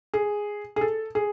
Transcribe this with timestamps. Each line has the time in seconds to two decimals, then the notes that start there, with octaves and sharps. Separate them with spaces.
0.14 G#4
0.76 G#4
0.81 A4
1.15 G#4